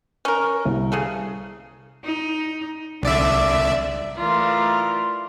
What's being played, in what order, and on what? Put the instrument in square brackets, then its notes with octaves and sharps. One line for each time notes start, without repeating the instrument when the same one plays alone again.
[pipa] C#4 A#4
[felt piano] C2
[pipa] C#3 G#4 A4
[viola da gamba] D#4
[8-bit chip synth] C2 D5 E5 [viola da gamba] D3
[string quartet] E3 A3 F4 A#4 D5